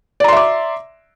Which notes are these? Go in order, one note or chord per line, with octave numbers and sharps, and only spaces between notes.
D5 E5 A#5 C6 D6